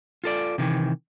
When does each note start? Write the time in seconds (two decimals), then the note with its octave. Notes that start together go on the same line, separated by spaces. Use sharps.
0.24 F4 A4 D5
0.58 C3 D#3 E3